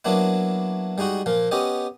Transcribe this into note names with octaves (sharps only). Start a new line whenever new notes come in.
F#3 A#3 B3 D4 E4
G3 G#3 D#4 F#4
A#2 F3 A#3
B3 C#4 G4 D#5